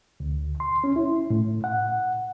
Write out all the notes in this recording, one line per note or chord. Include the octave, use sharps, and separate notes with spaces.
D2
C6
C#4
E4
A2
F#5